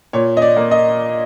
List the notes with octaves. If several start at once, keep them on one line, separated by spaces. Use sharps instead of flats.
A#2 C#5
D#5
D5
A#3
D#5